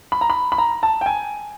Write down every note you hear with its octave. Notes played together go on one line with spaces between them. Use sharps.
B5
A#5
B5
B5
A#5
A5
G5
G#5